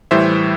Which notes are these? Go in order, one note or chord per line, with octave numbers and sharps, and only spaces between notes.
A2 E3 G3 C5 E5